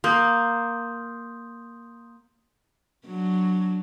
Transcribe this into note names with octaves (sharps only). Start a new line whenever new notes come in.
A#3 C6 D#6 G6
F#3 D4